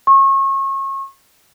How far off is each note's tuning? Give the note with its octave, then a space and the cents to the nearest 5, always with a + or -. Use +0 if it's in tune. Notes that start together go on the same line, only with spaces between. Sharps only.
C#6 -30